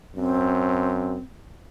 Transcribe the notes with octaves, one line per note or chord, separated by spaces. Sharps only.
F#2 C4